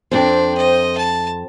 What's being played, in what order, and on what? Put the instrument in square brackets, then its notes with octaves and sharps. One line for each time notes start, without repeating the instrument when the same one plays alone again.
[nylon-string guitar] F2 C4 [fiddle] D4 [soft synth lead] C5
[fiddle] D#5
A5